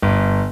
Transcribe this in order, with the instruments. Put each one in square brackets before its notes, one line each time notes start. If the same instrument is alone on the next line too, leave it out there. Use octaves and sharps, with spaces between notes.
[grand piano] G1